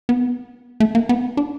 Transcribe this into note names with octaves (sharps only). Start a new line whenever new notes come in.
B3
A3
A#3
B3
D4